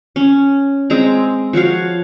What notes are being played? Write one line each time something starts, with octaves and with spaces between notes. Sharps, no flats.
C#4
G#3 C4 A#5
F3 F#4 C#5 F5